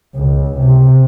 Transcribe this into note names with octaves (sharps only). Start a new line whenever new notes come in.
C#2
C3